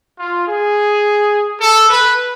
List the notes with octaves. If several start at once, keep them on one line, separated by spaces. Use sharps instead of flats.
F4
G#4
A4
B4